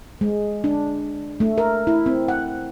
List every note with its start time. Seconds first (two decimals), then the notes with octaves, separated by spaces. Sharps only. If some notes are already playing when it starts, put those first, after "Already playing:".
0.21 G#3
0.64 D4
1.40 A3
1.58 A#4
1.87 E4
2.06 C4
2.28 F#5